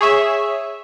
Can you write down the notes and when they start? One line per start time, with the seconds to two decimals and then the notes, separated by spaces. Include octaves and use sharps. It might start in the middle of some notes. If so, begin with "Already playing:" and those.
0.01 G#4 C#5 E5